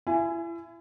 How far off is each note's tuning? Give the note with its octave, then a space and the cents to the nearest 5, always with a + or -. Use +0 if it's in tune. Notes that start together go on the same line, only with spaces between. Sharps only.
E4 +35 G#5 +0